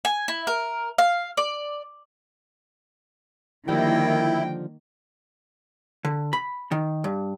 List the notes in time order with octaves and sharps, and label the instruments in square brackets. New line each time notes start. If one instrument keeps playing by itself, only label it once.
[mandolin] G#5
E4
A#4
F5
D5
[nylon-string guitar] D3 F3 G3 [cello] D#3 A#3 [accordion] E4 [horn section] G5
[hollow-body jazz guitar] D3
B5
D#3
G2